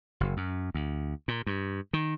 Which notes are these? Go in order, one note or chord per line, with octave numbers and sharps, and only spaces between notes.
F#1
F#2
D2
A#2
G2
D#3